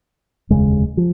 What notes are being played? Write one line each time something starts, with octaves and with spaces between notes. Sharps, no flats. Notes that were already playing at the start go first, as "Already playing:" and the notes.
F1 D#2 C#3 G#3
F3